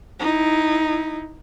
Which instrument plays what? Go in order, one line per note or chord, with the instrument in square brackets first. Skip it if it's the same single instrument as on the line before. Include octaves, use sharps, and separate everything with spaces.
[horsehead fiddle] D#4 E4